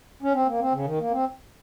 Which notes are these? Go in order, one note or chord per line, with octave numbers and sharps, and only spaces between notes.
C#4
C4
A#3
C4
C#3
D#3
A#3
C4